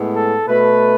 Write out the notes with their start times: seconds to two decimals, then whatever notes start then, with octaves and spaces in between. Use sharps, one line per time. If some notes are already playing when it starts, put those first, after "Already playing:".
Already playing: A2 G#3 B3
0.16 A4
0.48 B2 A3 B4